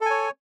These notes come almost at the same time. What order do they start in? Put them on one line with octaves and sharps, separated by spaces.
A4 G#5 C#5